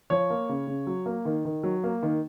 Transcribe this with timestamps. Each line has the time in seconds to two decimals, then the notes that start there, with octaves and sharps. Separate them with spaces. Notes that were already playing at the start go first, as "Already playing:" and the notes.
0.10 F3 C#5
0.30 A#3
0.49 C#3
0.67 C#3
0.87 F#3
1.06 A#3
1.25 D#3
1.45 D#3
1.63 F#3
1.84 A#3
2.03 D#3